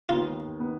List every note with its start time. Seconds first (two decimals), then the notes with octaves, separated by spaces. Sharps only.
0.09 D#2 D#3 B3 F4
0.60 D#3 B3